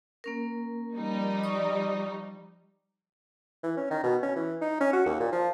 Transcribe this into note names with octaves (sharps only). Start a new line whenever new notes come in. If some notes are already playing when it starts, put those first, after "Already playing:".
A#3 C#4 A#4
F3 G3 D#4
D5 C#6 D#6
E3
C#4
D#3
B2
C#4
E3
D#4
C#4
F#4
D#2
A#2
F3